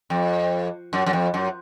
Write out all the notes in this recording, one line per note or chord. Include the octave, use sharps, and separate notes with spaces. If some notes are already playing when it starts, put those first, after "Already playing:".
F2
F#2
F#2
F2
F#2